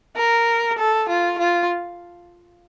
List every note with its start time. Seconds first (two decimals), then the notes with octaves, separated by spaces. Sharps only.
0.17 A#4
0.78 A4
1.09 F4
1.38 F4